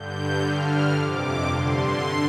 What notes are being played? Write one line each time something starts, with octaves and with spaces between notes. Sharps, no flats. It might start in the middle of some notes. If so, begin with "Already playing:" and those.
Already playing: G2 D3 G6
G2 D3 F6
F2 C3 D6
G2 D3 C6
D3